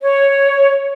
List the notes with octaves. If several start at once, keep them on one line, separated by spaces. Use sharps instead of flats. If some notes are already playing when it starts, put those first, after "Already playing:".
C#5